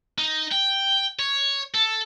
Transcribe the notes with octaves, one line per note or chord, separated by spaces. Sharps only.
D#4
G5
C#5
A4